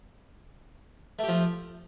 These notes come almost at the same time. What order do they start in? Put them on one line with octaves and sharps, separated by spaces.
A3 G4 F3